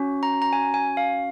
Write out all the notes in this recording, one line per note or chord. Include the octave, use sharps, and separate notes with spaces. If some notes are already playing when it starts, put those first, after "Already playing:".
Already playing: C#4 F#4
A#5
A#5
G#5
G#5
F5